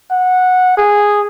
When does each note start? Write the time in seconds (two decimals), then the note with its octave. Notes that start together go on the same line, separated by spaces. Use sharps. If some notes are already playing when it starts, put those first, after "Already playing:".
0.11 F#5
0.78 G#4